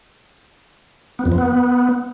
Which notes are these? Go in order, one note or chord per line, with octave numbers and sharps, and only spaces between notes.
B3
F2
F3
B3